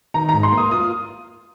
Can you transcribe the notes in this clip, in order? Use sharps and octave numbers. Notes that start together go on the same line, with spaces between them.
D#3 A#5
G#2 A#5
C6
A#3
D#6
F4 D#6